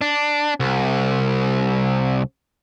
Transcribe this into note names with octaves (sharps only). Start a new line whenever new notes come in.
D4
C2